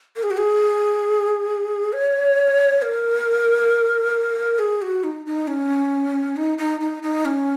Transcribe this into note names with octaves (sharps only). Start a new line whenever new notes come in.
A#4
G#4
F#4
G#4
C#5
A#4
G#4
F#4
D#4
D#4
C#4
D#4
D#4
D#4
D#4
C#4